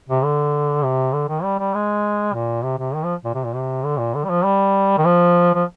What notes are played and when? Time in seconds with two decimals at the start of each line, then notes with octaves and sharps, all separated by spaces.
0.09 C3
0.24 D3
0.84 C3
1.13 D3
1.29 D#3
1.43 G3
1.59 G3
1.74 G#3
2.34 A#2
2.63 C3
2.78 C3
2.94 D#3
3.04 F3
3.24 A#2
3.34 C3
3.44 A#2
3.54 C3
3.85 D3
3.99 A#2
4.14 D3
4.25 G3
4.30 F3
4.44 G3
4.98 D#3
5.05 F3
5.54 F3